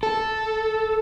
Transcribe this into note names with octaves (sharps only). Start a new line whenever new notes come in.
A4